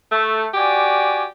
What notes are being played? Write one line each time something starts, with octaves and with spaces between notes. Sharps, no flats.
A3
F#4 G4 D5 G#5